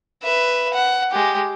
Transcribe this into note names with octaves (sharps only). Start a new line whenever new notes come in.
B4 E5
F#5
G#3 G4